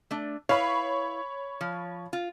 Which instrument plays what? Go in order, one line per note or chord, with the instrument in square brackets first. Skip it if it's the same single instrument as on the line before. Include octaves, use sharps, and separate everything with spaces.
[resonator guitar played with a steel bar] A3 D4
[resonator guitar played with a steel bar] E4 B4 F5 [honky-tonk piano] C#5 B5
[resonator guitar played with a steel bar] F3
F4